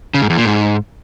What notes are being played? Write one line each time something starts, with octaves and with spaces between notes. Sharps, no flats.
C#3
G#2
E2
A#2
G#2